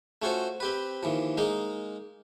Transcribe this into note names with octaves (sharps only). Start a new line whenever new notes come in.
A3 C#4 F4 F#4 C5
C4 G4 B4
D#2 E3 F3
G#3 A#3 D#4 F5